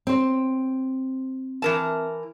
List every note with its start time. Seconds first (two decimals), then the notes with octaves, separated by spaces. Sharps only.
0.07 C4 C5
1.62 E3 A#4 A5